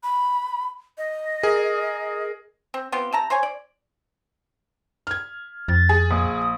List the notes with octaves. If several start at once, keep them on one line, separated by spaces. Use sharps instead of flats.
B5
D#5
G#4 A#4
C4
B3 C4 F4 G4
C3 A5 A#5
C5 C#5 G#5
D5
F6 G#6
F2 A6
G#4
A#1 D#6